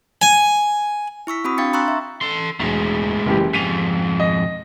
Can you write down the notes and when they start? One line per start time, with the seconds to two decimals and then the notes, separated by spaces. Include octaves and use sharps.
0.22 G#5
1.27 E4 C#6 E6 B6
1.44 C4 F#4 B5 D#6
1.58 D4 F5 G5 A6 C#7
1.73 A#5 C6 C#6 E6 F#6 A6
1.88 E5
2.21 A4 C6
2.60 E1 A2 G#3
3.26 F#1 E3 G4
3.53 F2 G#2 B6 D#7 F7
4.20 D#5